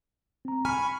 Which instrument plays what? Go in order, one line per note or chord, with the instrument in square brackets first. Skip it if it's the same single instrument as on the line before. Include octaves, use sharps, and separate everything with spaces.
[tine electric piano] C4 A#5
[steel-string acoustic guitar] G#5 [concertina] B5 C#6 [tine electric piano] F6